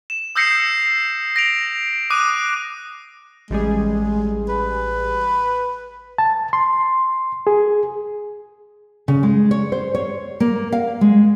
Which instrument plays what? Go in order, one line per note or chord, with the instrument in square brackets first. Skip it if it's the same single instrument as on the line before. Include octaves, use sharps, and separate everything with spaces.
[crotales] E7
D#6 E6 G6 A#6 C7 C#7
A#6 D7 F7
D6 D#6 F#6 D#7
[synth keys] A1 G3 G#4 [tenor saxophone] G#3
[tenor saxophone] B4
[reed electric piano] A5
C6
G#4
[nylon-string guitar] C#3
G#3
C#5
C5
C#5
A#3
F5
G#3